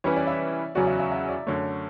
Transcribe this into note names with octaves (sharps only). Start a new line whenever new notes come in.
E3 G3 C#4 E4 B4 C#5
D5
E5
E2 C#3 F#3 C#4 F#4 D5
E5
E5
E5
D5
F#2 D3 A3 C#5